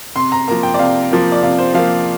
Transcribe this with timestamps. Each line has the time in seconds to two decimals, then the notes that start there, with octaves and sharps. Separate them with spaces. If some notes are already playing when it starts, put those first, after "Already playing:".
0.16 C3 C6
0.32 A#5
0.48 F3 A#3 A#5
0.63 G5
0.74 D5
0.79 C3 F5
1.12 F3 A#3
1.32 D5
1.43 C3 F5
1.58 C5
1.74 F3 A#3 F5